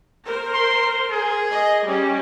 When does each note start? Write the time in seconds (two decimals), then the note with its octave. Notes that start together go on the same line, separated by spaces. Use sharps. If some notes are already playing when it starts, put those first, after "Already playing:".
0.25 A#4 C5
0.54 C6
1.11 G#4
1.51 D#5
1.85 G3 C#4